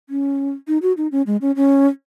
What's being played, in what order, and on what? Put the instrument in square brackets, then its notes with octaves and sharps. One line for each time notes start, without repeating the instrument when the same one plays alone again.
[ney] C#4
D#4
F#4
D#4
C#4
G#3
C#4
C#4